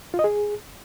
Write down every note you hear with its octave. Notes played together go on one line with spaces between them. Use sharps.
F4
D#5
G#4